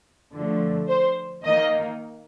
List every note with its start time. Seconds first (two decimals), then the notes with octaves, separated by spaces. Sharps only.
0.33 D3 F3 A3
0.88 C5
1.44 D#3 A#3 D#4 D#5